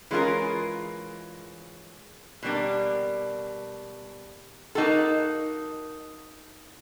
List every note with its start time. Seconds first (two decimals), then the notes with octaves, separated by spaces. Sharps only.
0.11 E3 G#3 C#4 F4 A#4
2.43 B2 G3 A#3 D4
4.75 A#3 D#4 F#4 A4